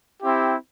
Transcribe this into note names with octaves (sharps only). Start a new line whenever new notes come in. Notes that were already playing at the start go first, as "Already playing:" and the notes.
C4 E4 G4